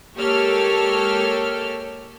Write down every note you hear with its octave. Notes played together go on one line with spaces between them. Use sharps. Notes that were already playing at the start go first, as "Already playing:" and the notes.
G#3 A#3 G4 A4 C#5 F6